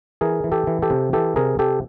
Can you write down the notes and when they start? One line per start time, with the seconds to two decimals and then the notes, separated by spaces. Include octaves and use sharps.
0.21 E3 G#4 A#4
0.44 E3
0.52 G4 A4
0.67 E3
0.82 G4 A4
0.90 C3
1.13 E3 G4 A4
1.36 C3 G#4 A#4
1.59 C3 G4 A4